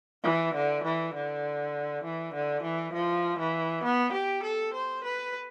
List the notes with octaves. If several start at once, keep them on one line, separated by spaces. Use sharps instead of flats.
E3
D3
E3
D3
E3
D3
E3
F3
E3
B3
G4
A4
C5
B4